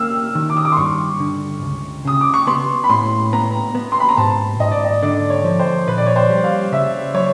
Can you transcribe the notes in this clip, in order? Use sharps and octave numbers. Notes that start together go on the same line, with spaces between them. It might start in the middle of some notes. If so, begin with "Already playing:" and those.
Already playing: A#3 E6 F6
D#3
D6
D#6
D6
C6
G2 C#6
D3
C#2
C#3 D#6
D6
C#6
B3 C6
B5
A2 C6
B3 A#5
B3
C6
B5
A#5
G#2 A5
G#2 D#5
D5
D#5
D3 D5
C#5
F3
C5
A#2 B4
D5
C#5
C5
G3
F5
C#3 E5
F#3 C#5